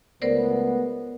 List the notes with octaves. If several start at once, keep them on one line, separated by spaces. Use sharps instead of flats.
C#2 A3 B3 A#4 C5 D5